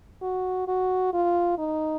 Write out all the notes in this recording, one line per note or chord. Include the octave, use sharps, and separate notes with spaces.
F#4
F#4
F4
D#4